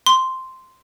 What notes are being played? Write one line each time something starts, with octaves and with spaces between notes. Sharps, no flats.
C6